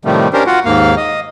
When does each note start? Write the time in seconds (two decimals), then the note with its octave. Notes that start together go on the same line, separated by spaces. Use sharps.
0.05 A2 C3 D#3 F3 G3 A3
0.33 C#4 D4 G4 A#4 C5
0.47 F4 F#4 F#5
0.65 D#2 G#2 A#3 F5
0.97 D#5